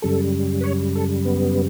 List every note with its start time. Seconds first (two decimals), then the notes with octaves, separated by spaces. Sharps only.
0.02 F#2 C#3 G3 A4
0.61 B4
0.64 C#5
0.95 A4
1.25 B3